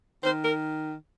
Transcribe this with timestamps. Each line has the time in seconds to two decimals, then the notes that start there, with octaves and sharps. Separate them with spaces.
0.24 D#3 C5
0.45 A#4